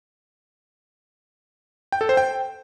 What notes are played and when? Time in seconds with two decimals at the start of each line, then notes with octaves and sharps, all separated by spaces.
1.92 G5
2.01 A4
2.09 C5
2.17 G5